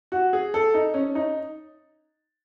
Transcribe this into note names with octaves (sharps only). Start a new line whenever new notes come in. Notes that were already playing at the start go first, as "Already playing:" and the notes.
F#4
G#4
A4
D#4
C#4
D#4